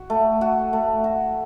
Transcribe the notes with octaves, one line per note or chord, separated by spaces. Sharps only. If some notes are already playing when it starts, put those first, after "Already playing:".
Already playing: F#4
A3
F#4
A3
F#4